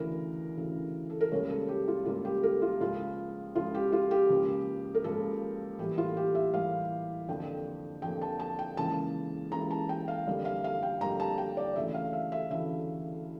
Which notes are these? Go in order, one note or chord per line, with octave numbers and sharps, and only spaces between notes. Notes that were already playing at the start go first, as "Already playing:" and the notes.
Already playing: D2 C#3 E3 A#4
D2 C#3 E3
A4
A#4
C#2 C#3 G3 A#3 C#5
A4
G4
F4
C#2 C#3 G3 A#3 F4
G4
A#4
F4
C#2 C#3 F3 F4
C#2 C#3 F3 F4
G4
F4
G4
C#2 C#3 F3 A#3
A#4
C#2 C#3 F3 A#3 A4
A2 E3 G3 A#3 G4
F4
G4
E5
A2 E3 G3 A#3 F5
F2 D3 F3 A#3 G5
F2 D3 F3 A#3 G5
A5
A5
G5
C#2 C#3 E3 A#3 A5
C#2 C#3 E3 A#3 A#5
A5
G5
F5
F2 D3 G3 A#3
F5
F5
G5
F2 D3 G3 A#3 A#5
A5
G5
D5
D2 C#3 E3 A3 E5
F5
E5
E5
D2 C#3 E3 A3 E5